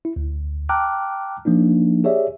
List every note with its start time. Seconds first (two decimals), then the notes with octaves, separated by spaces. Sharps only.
0.05 E4
0.16 D2
0.69 G5 A5 A#5 D6 F6 F#6
1.45 F3 A#3 D4 D#4
2.04 G4 G#4 C#5 D5 E5